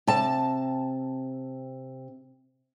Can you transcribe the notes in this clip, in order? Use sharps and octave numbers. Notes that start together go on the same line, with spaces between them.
C3 A5